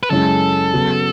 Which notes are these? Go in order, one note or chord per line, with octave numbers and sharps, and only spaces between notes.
B4
F#2 C#3 G#3 C#4 E4 A4
C#3 F#3 B3